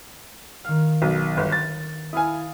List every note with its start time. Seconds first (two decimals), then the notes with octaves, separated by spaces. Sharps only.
0.64 D#3 F5
1.02 B1
1.37 G1
1.52 A6
2.13 E4 F5 G#5 D#6